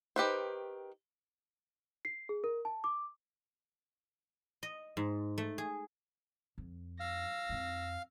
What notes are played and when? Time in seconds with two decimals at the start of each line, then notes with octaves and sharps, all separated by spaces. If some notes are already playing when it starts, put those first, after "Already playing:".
0.16 D#3 G4 B4 C5
2.05 C7
2.29 G#4
2.44 A#4
2.65 A5
2.84 D6
4.63 D#5
4.97 G#2
5.38 A3
5.58 G#4
6.58 F2
7.00 F5 E6 A#6
7.49 F2 E4